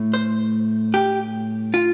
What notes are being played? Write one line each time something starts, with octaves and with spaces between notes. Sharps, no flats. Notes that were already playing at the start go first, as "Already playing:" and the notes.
Already playing: A2 A3
C5
G4
F4